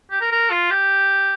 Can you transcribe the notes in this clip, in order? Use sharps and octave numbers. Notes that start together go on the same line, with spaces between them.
G4
A#4
A#4
F4
G4